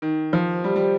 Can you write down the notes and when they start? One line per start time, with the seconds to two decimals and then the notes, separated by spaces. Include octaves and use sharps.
0.02 D#3
0.33 F3
0.64 G3
0.76 G3